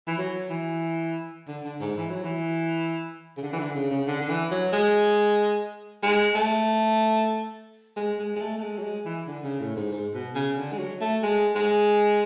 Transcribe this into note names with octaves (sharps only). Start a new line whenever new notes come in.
E3
F#3
E3
D3
D3
G#2
E3
F#3
E3
C#3
D3
E3
D3
C#3
C#3
D3
D3
E3
F#3
G#3
G#3
A3
G#3
G#3
G#3
A3
A3
G#3
F#3
G#3
E3
D3
C#3
A2
G#2
G#2
B2
C#3
D3
G#3
F#3
A3
G#3
G#3